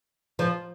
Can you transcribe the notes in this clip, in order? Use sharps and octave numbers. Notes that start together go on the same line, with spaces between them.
F3